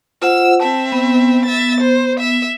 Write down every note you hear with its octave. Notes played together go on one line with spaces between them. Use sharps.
F4 C5 F#5 E6
C4 E5 A5
B3
E5 A6
C5
E5